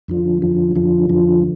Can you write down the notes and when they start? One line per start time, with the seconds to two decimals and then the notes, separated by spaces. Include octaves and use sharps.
0.08 F2 D3 F3
0.42 F2 D3 F3
0.76 F2 D3 F3
1.09 F2 D3 F3